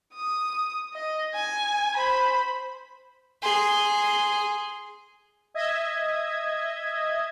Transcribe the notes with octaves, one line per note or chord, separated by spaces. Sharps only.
D#6
D#5
G#5
C5 B5
G#4 C6
D#5 E5 G#6